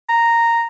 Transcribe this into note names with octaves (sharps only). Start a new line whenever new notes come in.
A#5